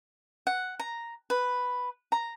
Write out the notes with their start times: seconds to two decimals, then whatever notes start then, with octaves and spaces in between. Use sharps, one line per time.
0.47 F#5
0.80 A#5
1.30 B4
2.12 A#5